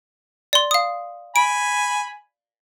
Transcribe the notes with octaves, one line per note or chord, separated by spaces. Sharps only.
D5 C6
F5 D#6
G#5 B5 D7